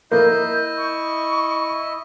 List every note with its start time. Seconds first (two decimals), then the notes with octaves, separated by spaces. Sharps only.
0.12 A#3 E4 D#5 G6
0.77 C#6